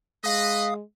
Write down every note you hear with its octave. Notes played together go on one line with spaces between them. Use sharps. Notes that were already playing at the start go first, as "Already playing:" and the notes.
G#3 B4 D#5 F5 D#6